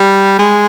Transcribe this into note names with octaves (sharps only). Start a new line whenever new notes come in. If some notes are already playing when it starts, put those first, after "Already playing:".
Already playing: G3
G#3